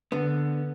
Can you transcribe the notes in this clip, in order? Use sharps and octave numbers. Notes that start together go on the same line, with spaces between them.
D3 B3